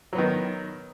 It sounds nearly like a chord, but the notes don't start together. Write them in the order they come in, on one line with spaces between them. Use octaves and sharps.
F#3 B3 D#3